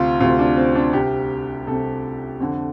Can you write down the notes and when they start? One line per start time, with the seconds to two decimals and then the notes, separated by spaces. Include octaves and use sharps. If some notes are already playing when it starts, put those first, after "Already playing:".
Already playing: D2 C3 C4 F4
0.20 D2 C3 F4
0.39 D4
0.57 C4
0.75 D4
0.93 C2 C3 G4
1.67 C2 C3 A4
2.40 F2 D3